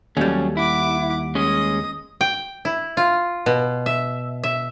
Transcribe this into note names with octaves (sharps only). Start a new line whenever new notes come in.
D#2 F#3 G3 A3 C#4
E4 F#5 D6
G#3 C#4 D#5 D#6
G5
E4
F4
B2
E5
E5